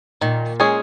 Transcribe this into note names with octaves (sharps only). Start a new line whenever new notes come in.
A#2 D#3
G#3 C#4 G#4